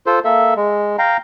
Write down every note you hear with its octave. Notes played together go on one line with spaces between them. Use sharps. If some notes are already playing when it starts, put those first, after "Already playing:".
F4 A4 C5
A#3 A4 E5
G#3
F5 G5 A#5